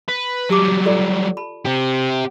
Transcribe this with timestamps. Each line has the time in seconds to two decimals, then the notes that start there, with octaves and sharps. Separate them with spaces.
0.09 B4
0.50 F#3 G3 G4 A5 D6
0.85 F4 A4 D5
1.37 A5 B5
1.65 C4 G4